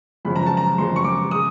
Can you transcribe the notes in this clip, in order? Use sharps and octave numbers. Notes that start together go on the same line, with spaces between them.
G#1 F#2 C#3 F3 B5
A#5
A5
A#5
G#1 F#2 C#3 F3 C6
C#6
D6
C#3 D#6